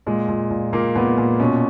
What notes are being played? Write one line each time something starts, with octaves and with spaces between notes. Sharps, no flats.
A#2 G#3
A#2
A#2
A#2 A#3
A#2 B3
A#2
B2 C#4